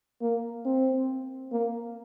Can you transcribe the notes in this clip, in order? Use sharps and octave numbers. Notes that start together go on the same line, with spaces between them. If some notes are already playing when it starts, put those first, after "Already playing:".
A#3
C4
A#3